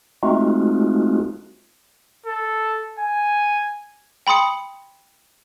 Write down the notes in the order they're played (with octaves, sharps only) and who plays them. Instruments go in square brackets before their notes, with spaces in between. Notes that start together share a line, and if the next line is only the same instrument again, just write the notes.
[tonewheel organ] G#3 A3 C4 D#4 F4 F#4
[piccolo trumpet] A4
G#5
[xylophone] G5 B5 C6 D#6 C#7